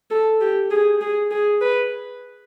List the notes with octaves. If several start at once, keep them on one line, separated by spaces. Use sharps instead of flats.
A4
G4
G#4
G#4
G#4
B4